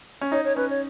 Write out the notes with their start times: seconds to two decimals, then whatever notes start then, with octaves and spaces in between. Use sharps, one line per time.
0.21 C#4
0.32 D#4 C#5
0.45 C#5
0.56 C#4 B4
0.70 C#5